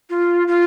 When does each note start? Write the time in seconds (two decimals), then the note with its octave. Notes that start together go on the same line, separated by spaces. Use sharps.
0.10 F4
0.48 F4